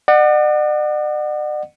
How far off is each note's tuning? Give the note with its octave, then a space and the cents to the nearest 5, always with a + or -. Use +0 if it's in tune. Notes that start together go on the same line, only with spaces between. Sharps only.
D5 +45 F#5 +0